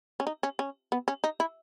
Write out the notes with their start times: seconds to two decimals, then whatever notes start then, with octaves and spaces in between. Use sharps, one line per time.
0.20 C#4
0.27 D#4
0.43 C#4
0.59 C#4
0.92 B3
1.08 C#4
1.24 D#4
1.40 E4